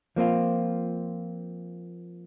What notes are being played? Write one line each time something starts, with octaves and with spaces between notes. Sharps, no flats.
F3 A#3 C4 F4